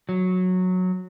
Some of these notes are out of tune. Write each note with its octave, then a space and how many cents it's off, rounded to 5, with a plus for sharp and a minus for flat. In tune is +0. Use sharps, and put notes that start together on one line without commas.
F#3 -10